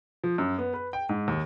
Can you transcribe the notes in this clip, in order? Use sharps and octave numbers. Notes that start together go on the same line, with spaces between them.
F3
F#2
B3
B4
G5
G#2
D#2